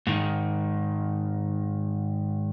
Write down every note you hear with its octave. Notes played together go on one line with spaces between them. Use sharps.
G#2 D#3